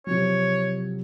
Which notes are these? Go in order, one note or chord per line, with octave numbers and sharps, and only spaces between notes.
C3 F3 F#3 C#5